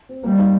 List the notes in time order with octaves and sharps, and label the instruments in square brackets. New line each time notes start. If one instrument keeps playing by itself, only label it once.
[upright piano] C4
[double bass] G3 [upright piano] A#3
[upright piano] D#4